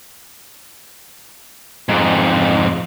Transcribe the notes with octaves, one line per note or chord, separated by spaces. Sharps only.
F2 G#2